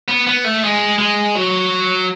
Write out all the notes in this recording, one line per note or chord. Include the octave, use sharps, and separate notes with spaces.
B3
B3
A3
G#3
G#3
F#3